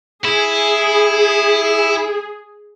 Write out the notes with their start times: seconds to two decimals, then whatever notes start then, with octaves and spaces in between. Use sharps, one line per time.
0.25 E4 G#4